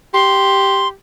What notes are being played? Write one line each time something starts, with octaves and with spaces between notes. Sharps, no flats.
G4 C6